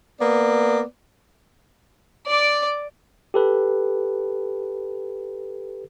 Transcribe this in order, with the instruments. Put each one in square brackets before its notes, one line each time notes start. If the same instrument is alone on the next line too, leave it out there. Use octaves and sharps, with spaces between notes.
[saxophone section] A#3 B3 D5
[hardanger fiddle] D5 D6
[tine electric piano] G4 A4 B4